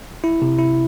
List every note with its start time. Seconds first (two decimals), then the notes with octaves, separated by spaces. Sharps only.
0.24 E4
0.42 C3
0.59 E4